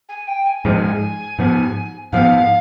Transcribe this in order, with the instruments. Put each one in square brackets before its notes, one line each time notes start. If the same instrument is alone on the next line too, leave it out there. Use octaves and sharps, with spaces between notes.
[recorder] G#5
G5
G#5
[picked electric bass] G#2 F3 G#3
G#2 F3 B3
[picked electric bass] G#2 F3 B3 [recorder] F5